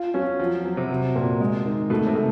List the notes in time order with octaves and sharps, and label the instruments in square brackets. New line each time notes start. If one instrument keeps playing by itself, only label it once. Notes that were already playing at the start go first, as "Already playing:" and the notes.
Already playing: [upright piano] F4
[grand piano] F#3 [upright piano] C#4
[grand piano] F3 [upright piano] F#3
[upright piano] F#3
[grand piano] C3
[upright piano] F#3
A#2
G#3
D#3
[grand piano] B2 [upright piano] A3
[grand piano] C3
[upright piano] A3